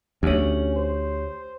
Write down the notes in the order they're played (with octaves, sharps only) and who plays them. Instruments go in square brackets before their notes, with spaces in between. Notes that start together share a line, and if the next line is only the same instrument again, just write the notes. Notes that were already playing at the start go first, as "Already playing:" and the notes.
[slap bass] D2 [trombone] C#4 [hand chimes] G4 C#5
[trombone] C5